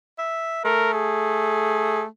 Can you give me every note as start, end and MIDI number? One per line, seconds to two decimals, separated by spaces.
0.18 0.63 76
0.65 2.05 57
0.65 0.89 70
0.93 2.05 68